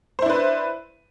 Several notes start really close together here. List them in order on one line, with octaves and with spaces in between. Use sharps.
C5 E4 D4 B4